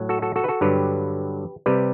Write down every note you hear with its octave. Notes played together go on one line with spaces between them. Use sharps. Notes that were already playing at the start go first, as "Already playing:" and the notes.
Already playing: A2 F#3
F#4 A4
F#4 A4
F#4 A4
B4
F#4 A4
G2 D3 F#3 G4 B4
C3 G3 G4 B4